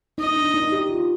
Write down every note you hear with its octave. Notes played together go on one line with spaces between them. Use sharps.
D#4 D#5
D4
D#4
G4
F4